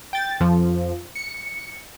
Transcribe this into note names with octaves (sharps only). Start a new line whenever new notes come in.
G5 A6
F2 F3
C#7